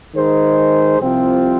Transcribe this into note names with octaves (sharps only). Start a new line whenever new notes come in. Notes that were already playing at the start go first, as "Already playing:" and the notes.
D#3 G#3 D#4 G#4 C5
C2 C3 F3 C4 F4